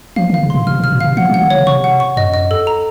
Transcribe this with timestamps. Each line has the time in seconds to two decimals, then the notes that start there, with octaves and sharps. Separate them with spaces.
0.16 F3 F5
0.30 D#3
0.34 F5
0.42 C#3
0.50 A#2 C6
0.67 C3 F6
0.80 C3
0.84 F6
0.92 A#2
1.00 C3 F5
1.17 F3 F#5
1.30 F#3
1.34 F#5
1.42 D#3
1.50 C#3 C#5
1.67 C3 C#6
1.84 F#5
2.00 C#6
2.17 F#2 D#5
2.34 D#5
2.51 A4
2.67 A#5